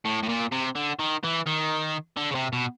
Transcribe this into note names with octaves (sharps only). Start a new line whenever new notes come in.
A2
A2
A#2
C3
D3
D#3
E3
D#3
D3
C#3
C3
B2